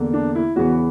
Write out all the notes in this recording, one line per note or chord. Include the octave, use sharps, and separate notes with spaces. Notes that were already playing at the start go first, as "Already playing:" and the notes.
Already playing: E2 D3 A#3
D4
E4
E2 C#3 E3 B3 F#4